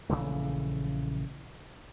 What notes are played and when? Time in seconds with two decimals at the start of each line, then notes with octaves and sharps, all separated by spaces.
0.10 A#1 C#3 E3 A3